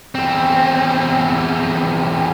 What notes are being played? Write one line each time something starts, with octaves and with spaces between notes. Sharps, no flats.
E2 C4